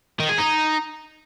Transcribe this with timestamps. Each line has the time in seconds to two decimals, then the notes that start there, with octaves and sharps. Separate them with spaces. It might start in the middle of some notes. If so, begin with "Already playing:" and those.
0.20 D#3
0.29 G#4
0.39 D#4